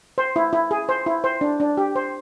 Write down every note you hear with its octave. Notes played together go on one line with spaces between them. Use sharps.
C5
E4
E4
G#4
C5
E4
C5
D4
D4
G4
C5